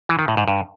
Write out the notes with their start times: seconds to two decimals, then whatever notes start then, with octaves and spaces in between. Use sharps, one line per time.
0.09 E3
0.19 D#3
0.28 A2
0.37 G#2
0.48 G2